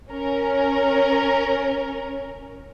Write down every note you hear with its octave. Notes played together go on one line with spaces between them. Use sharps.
C#4 A#4